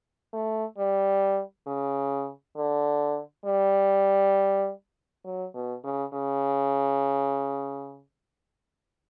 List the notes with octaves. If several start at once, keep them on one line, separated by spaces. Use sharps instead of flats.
A3
G3
C#3
D3
G3
F#3
B2
C#3
C#3